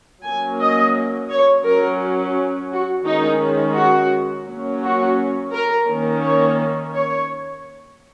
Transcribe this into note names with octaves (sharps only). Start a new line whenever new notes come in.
F#3 A#3 C#4 G#5
D#5
C#5
F#3 C#4 A#4
F#4
D#3 G#3 C#4 D#4
F#4
F#3 A#3 C#4
F#4
A#4
D#3 A#3 C#4
C#5
C#5